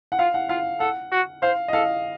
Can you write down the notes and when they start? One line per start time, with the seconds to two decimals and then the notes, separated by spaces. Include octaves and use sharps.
0.12 F#5
0.19 F4 F5
0.34 F#5
0.49 F4 F5
0.80 A4 F#5
1.12 F#4
1.42 C5 F5
1.68 D#5
1.73 A4 F5